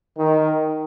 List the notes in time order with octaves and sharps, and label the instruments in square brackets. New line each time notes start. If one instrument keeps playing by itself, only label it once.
[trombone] D#3